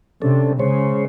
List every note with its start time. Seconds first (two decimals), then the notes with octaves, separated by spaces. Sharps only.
0.22 C3 C#4 D4 A4
0.59 C#3 G#3 C5 C#5